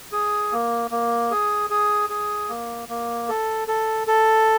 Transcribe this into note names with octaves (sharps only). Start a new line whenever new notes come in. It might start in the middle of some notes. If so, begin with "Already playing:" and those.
G#4
A#3
A#3
G#4
G#4
G#4
A#3
A#3
A4
A4
A4